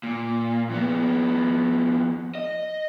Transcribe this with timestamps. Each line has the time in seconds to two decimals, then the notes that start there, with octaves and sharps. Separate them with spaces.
0.03 A#2
0.70 F2 B3
2.35 D#5